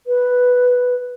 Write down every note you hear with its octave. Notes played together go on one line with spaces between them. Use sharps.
B4